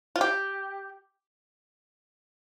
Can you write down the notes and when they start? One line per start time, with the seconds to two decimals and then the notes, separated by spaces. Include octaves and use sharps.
0.16 F4
0.21 G4